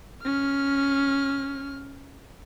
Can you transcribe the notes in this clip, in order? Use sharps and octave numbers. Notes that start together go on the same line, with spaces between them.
C#4 F6